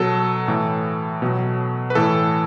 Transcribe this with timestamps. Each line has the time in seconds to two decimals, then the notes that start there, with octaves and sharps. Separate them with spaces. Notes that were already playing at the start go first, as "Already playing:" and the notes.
Already playing: B2 F#3 A4
0.48 A2 E3
1.22 B2 F#3
1.90 B4
1.95 A2 E3 A4